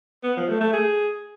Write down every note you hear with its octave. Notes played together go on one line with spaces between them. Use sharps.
B3
F3
A3
A3
G#4